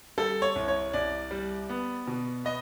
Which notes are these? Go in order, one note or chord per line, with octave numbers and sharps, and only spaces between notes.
G3 A4
C#5
C2
C#5
C2 D5
G3
B3
B2
B3 D#5